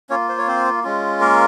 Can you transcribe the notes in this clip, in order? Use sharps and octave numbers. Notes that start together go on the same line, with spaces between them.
A#3 C#4 F4 C#5
C5
C#5
C4 C5
G#3 C#4 F4
A#3 A#4